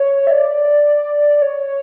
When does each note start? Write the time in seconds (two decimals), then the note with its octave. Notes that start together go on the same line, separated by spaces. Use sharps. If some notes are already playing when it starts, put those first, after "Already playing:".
Already playing: C#5
0.27 E5
0.31 D5
1.42 C#5